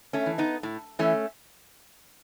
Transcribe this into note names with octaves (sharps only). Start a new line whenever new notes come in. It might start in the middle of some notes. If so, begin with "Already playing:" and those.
A3 C#4
E3
B3 D#4
A2
E3 A3 C#4